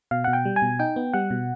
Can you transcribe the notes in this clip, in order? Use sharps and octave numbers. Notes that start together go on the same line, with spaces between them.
B2 F5
B2 F#5
G5
G3
G#5
B2
D#4 G5
B3
G3 F#5
B2